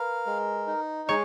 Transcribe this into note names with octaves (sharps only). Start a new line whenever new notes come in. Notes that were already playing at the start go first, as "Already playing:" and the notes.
Already playing: A#4 B4 F5
G#3
D#4
G#3 C#5